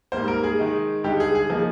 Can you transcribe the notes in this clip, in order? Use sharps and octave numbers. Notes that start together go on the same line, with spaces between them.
G#2 G3 A#3 C5
A#4
G#4
D#3 G#3 D#4
G2 D3 G#3 D#4 G4
G#4
G#4
F3 A#3 D#4 G#4